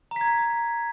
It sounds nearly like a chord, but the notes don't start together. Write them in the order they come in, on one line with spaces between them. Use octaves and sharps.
A#5 B6 G#6